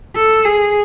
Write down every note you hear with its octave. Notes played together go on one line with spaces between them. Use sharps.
A4
G#4